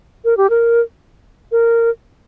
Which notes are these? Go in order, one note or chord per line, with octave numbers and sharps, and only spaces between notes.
A#4
G4
A#4
A#4